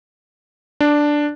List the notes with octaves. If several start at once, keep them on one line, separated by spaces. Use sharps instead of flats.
D4